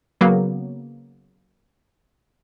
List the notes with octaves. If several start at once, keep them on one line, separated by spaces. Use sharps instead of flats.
C#3 F#3 A#3 B3